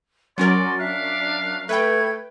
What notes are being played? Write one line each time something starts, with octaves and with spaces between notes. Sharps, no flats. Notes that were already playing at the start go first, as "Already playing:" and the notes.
F#3 C#4 F#4 A#4 D5 G#5 C6
D4 E5 F5 F#6
A3 B4 G5 G#6